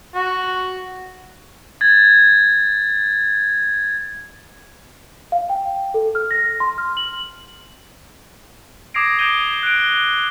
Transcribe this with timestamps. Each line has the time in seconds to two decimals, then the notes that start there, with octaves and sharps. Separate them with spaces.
0.14 F#4
1.81 G#6 A6
5.32 F5
5.49 G5
5.94 A4
6.15 F6
6.31 A#6
6.60 C6
6.78 F6
6.97 F#7
8.94 D6 D#6 G#6 A#6 C7 D7
9.19 D6 D#6 G6 D7 D#7 G7
9.63 F#6 D7
9.80 G7